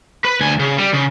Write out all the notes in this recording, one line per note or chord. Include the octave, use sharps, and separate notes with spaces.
B4
D2 G#5
C#3
G3
C#3